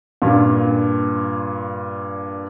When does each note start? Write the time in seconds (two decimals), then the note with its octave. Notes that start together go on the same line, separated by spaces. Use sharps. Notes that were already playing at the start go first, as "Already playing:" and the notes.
0.22 G2 A#2 F4